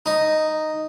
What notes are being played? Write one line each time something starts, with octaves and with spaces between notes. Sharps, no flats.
D#4